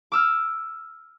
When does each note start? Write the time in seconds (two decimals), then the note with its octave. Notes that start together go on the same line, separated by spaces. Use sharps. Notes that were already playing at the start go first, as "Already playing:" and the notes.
0.12 D6 E6 F6